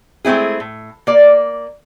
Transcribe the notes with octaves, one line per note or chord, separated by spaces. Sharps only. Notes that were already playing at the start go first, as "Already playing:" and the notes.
G#3 A3 C4 E4 G#4
A2
A#3 D5